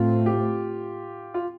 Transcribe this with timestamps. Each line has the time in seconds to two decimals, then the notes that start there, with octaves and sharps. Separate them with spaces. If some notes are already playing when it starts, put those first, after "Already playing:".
Already playing: A2 A3 C4 F4
0.26 G4
1.34 F4